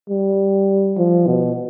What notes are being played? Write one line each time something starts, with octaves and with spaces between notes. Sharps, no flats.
G3
F3
B2